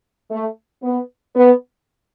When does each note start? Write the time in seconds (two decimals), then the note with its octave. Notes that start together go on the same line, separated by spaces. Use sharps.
0.31 A3
0.83 B3
1.35 B3